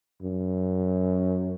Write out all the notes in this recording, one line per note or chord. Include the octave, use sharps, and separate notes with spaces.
F#2